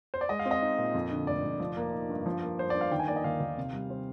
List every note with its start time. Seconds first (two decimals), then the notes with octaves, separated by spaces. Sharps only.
0.14 C5
0.21 D5
0.29 G#3 D#5
0.39 F5
0.45 C4
0.51 D#5
0.62 D#4
0.78 A#2
0.94 F2
1.11 D3
1.27 F1 D5
1.44 F1
1.60 F3
1.77 A#3
1.93 D#4
2.10 G2
2.26 F3
2.43 A#3
2.59 G2 C5
2.70 G2 D5
2.81 F5
2.92 D#3 G5
3.00 G#5
3.08 A#3 D5
3.16 D#5
3.24 D#2 F5
3.40 D#2
3.57 C3
3.73 G3
3.90 C4